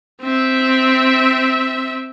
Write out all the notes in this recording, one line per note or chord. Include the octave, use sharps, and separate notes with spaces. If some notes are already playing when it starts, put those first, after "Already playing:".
C4 E5